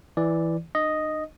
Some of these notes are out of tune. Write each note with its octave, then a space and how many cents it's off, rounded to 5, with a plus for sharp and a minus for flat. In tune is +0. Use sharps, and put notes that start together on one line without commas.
E3 +0 D5 +0
D#4 -45 D#5 +0